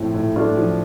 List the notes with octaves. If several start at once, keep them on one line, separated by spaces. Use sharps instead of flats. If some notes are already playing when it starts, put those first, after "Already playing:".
Already playing: A2 F3 A3 C4 E4
A2
A3 D4 F4
F3